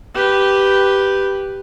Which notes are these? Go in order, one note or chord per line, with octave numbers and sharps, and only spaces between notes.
G4 B4